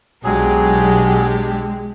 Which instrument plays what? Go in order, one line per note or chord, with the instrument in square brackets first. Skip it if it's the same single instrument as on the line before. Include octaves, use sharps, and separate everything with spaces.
[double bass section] B1 [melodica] F#3 G#4 [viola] G#3 [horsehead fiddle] D4 G4